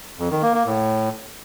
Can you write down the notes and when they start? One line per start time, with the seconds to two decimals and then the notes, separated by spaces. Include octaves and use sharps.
0.19 F2
0.31 D#3
0.43 A#3
0.54 A#3
0.66 A2